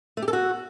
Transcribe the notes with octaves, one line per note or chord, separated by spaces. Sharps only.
A3
G4
A4
F#4